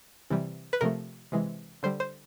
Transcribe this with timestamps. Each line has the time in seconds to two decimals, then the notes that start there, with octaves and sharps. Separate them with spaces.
0.30 C3 E3 G3
0.73 B4
0.81 C3 F3 A3 A#4
1.32 C3 E3 G#3
1.83 D3 G3 C5
2.00 C5